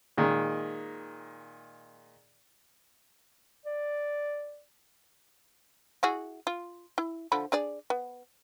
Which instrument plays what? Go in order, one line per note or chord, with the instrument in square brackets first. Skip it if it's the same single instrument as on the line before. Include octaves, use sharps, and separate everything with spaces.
[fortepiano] A#2 D#3 G#3
[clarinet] D5
[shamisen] E4 F#4 G#4
F4
E4
D3 F3 B5
D4 G#4 D5
B3